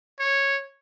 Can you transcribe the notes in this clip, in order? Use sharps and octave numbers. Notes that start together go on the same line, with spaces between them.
C#5